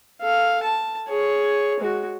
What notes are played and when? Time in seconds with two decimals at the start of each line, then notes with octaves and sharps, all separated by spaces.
0.22 A4 F5
0.63 A5
1.08 G#4 C#5
1.79 G#3 F#4